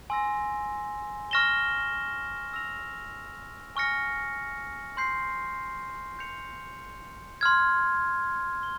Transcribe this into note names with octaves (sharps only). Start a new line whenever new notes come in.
G#5 C6 E6 A#6
C#6 F6 A#6 E7 G7
E6 A#6 F7
G#5 C#6 F6 A#6 C#7
C6 G6 C7
G6 C#7 F7
C6 F6 G#6
G7